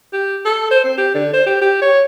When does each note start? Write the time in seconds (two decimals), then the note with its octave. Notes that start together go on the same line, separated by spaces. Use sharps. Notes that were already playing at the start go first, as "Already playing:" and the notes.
0.13 G4
0.45 A4
0.71 C5
0.84 C4
0.98 G4
1.14 D3
1.33 C5
1.46 G4
1.61 G4
1.82 C#5